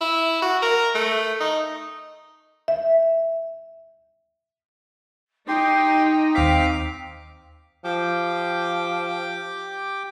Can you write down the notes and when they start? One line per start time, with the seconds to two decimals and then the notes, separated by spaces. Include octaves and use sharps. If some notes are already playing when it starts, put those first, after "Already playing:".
0.01 E4
0.42 F#4
0.62 A#4
0.95 A3
1.41 D#4
2.68 E5
5.48 D#4 G4 G5 C6
6.35 D#2 C4 F5 D6 B6
7.84 F3 G4 G5 D6